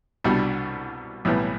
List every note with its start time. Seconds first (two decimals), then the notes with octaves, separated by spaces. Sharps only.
0.24 C2 B2 G3 D4
1.25 B1 A2 E3 G3 B3